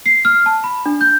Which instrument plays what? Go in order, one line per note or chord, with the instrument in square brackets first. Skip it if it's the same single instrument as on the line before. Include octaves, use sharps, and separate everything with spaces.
[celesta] C7
F6
A5
B5
D4
G6